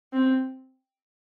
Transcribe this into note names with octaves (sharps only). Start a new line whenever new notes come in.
C4